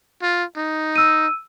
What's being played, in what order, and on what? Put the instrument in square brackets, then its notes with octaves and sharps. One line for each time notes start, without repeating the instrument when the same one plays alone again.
[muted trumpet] F4
D#4
[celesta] E6 D#7